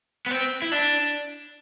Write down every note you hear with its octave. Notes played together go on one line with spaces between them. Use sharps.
B3
C4
E4
D4